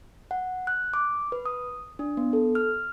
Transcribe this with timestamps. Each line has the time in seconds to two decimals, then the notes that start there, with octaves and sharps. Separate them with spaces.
0.31 F#5
0.67 F#6
0.94 D6
1.32 B4
1.46 D#6
1.99 D4
2.17 B3
2.33 A4
2.55 F6